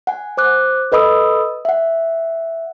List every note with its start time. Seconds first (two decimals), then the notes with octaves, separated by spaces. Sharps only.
0.07 F#5 G#5
0.37 C5 D6 F#6
0.92 A4 B4 D#5 B5 D#6 E6
1.65 E5 F#5